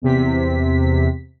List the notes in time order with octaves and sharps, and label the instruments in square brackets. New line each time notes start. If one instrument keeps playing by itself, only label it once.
[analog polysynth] E2 C3 B6